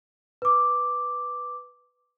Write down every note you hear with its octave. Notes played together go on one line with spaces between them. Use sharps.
B4 D6